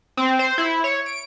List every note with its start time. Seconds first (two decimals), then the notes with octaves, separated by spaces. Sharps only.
0.17 C4
0.39 C5
0.58 E4
0.84 C#5
1.06 D7